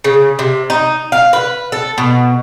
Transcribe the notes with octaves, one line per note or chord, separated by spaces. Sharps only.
C#3
C3
D#4
F5
B4
A4
B2